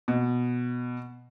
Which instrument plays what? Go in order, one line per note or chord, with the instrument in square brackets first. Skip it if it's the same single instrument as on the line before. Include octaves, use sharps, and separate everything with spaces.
[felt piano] B2